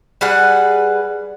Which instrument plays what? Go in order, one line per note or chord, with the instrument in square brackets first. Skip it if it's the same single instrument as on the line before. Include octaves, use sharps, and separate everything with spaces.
[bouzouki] G3 G#4 B4 F#5